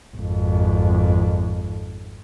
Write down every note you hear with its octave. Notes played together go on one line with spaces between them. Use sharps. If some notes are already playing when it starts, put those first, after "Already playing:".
G#1 F2